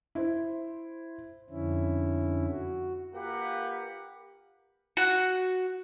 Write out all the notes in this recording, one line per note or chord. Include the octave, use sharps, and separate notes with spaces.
E4 C5
F2 D3 C#4 E4
F#4
A#3 F4 G4 A#4 B4 F#5
F#4